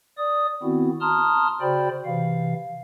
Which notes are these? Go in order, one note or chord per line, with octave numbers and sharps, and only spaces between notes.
D5 D#6
D#3 B3 C4 E4 F#4
A5 A#5 C6 D#6 F6
C#3 F#4 C5 D5 G5 B5
C3 E3 F5